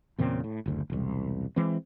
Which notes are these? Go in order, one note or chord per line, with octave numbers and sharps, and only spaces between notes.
E2 A#2 C#3 C4
A2
F#1 D2
E1 C2
E3 G#3 C4